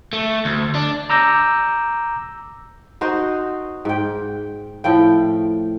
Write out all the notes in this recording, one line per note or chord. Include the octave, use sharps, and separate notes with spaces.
A3
D2
D4
A#5 D6 E6 G6 A#6
D#4 F#4 C5
G#2 G5
A2 F3 G5